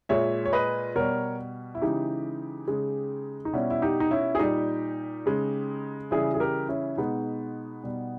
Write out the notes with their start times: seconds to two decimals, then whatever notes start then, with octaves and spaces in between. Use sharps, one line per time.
0.09 A#2 G#3 C#5 E5
0.45 C#5
0.53 B4 D#5
0.95 B2 G3 A#4 C#5
1.75 E4
1.82 C#3 E3 G#3 D#4 G4
2.68 C#3 G#3
3.45 D#4
3.53 B2 G3 C#4 E4
3.70 E4
3.82 D#4 G4
4.00 D#4
4.11 C#4 E4
4.35 G#4
4.39 A#2 G3 D#4 G4
5.26 C#3 G#3
6.11 C#3 E3 G3 E4 G#4
6.34 G#4
6.40 G4 A#4
6.69 C#4 E4
6.98 B2 G#3 B3 D#4
7.84 B2 G3